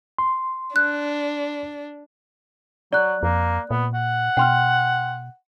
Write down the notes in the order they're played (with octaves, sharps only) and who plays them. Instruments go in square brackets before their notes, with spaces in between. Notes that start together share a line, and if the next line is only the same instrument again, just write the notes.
[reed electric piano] C6
[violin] D4 [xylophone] F#6
[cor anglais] F#3 [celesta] D5 F#6
[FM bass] F2 [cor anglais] A#3
[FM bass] A#2 [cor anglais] B3
[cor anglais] F#5
[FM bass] B2 [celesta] G5 C6 F6